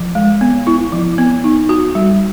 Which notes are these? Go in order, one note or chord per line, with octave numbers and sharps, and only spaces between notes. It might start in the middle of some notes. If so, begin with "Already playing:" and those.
Already playing: F3
G#3
B3
E4
F3
B3
D#4
F#4
G3